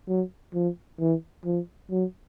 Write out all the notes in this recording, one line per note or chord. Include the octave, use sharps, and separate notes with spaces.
F#3
F3
E3
F3
F#3